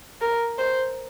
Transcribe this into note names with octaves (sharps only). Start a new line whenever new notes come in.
A#4
C5